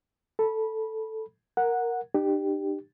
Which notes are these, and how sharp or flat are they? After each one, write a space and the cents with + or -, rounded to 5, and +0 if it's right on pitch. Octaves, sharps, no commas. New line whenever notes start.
A4 +0 B5 -20
A#4 +0 F#5 -10
D4 +45 G4 +0